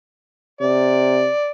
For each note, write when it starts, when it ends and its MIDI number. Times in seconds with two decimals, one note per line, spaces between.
0.61 1.28 48
0.61 1.51 74